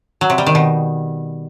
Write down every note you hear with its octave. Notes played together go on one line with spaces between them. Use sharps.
F#3
C3
G3
D#3
B2